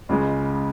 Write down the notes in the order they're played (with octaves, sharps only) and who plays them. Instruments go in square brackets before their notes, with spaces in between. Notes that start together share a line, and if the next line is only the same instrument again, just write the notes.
[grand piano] C#2 C#3 G#3